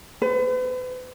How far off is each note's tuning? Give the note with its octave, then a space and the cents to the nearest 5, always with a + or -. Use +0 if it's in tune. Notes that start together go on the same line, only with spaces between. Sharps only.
B4 +40